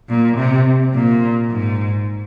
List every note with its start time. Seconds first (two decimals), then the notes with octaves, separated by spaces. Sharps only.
0.09 A#2
0.37 C3
0.94 A#2
1.50 G#2